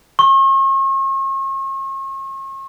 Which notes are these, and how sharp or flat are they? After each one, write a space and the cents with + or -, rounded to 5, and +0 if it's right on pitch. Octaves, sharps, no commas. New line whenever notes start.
C#6 -40